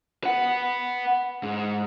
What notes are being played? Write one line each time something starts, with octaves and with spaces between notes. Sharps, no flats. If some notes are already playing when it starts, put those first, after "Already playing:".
B4 F#5
G#2